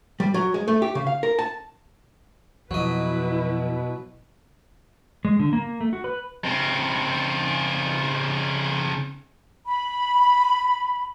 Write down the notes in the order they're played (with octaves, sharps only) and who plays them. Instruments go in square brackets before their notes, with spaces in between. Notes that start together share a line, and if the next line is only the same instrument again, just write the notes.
[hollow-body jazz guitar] G3
F#3
G#3
A3
G4
C#3
F5
A#4
A5
[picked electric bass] F2 [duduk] B2 [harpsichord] F#3 D#5 [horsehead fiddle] E4 B4
[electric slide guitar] G#3
D3
A#3
A3
F#4
B4
[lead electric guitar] C#3 C4
[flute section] B5